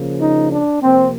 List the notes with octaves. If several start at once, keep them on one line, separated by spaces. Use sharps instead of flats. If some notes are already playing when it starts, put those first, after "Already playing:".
Already playing: C#3 F3 A#3
D#4
D4
C3 F3 A#3 C4